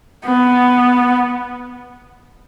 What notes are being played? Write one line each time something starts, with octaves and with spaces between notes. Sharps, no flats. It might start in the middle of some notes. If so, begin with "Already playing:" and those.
B3